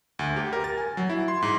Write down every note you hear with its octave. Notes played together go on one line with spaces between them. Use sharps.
D2
G4
A#4
A6
G#5
F#3
E4
C6
G#2